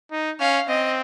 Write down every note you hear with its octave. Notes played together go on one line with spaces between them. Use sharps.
D#4
C#4 F5
C4 D#5